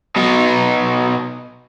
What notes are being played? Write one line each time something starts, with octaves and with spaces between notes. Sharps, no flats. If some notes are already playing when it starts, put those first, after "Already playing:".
B2 D#4